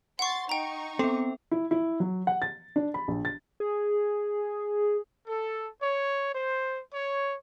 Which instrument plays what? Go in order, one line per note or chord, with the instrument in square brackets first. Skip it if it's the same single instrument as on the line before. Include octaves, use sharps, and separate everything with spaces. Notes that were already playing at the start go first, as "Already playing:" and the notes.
[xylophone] F#5 C#6 [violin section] C6 A6
[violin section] D#4 C#6 [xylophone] G5 A#5
[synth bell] B3 A4 [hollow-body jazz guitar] C4
[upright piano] E4
E4
F#3
F#5
A6
D4
B5
A#1
A6
[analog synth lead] G#4
[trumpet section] A4
C#5
C5
C#5